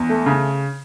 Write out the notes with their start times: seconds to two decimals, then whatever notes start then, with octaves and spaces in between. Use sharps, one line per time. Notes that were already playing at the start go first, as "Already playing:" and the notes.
Already playing: E2
0.09 A3
0.26 C#3